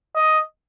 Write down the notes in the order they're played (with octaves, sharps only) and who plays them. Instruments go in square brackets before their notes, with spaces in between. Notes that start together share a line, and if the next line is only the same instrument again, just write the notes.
[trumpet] D#5